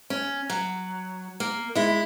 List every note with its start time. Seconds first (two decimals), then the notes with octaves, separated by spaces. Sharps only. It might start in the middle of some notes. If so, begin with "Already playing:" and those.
0.10 C#4
0.50 F#3
1.40 A#3
1.75 G#3 E4